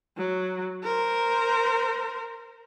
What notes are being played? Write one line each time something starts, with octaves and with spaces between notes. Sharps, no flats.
F#3
A#4 C5